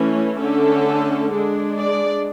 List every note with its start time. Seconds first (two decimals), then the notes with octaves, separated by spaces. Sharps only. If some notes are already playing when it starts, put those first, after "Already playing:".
Already playing: E3 A3 C#4
0.38 D3 A3 C#4 A4
1.32 G#3 D4
1.78 D5